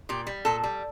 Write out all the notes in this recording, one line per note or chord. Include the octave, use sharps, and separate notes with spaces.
A#2 G4
G3
A#2 A4
G3